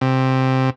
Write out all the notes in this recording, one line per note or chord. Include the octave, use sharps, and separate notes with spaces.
C3